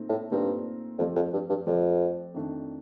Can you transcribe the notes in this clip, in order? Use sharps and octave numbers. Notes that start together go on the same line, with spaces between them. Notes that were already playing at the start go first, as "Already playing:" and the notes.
Already playing: A#2 A3 C4 D#4
A2
G2 A#2 A3 C4 D#4 A#4
F2 F3 A3 C4 G4 D5
F2
G2
G2
F2 F3 A3 C4 G4 D5
F2 D#3 A3 D4